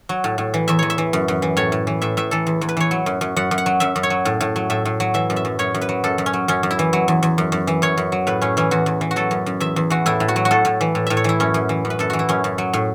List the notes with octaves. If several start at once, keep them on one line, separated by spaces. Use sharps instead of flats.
F#3
A2
A2
E3
E2 E5
E2 C#5
E5
E3
F#2
F#2
E3
A2 C#5
A2
E3
A2 E5
A2 E5
E3 A4
E2
E2
B4
E3 C#5
F#3
F#2
F#2
F#2 F#5
F#2
F#5
F#3
F#2 E5
F#2
C#5
F#3
A2
A2
F#3
A2 E5
A2
F#3
E3 E5
F#2
E5
F#2
F#2 C#5
F#2
B4
F#3
F#2 A4
F#2
C#4
F#3
F#2 C#4
F#2
E4
E3
F#3
E2
E2
F#2
F#2
E3
F#2 C#5
F#2
F#3
A2 B4
A2 C#4
E3 C#4
E2 F#4
E2
E3
F#4
F#3 A4
F#2
F#2
E2 E5
E2
E3 F#4
A2 E4
A2
F#4
F#3
F#4
A2 A4
A2
E3
A2
A2 E5
C#5
E3 E4
F#2 C#4
F#2
E3
F#2
B4
F#2 A4
E3 F#4
E4
F#2 C#4
F#2
F#3
A2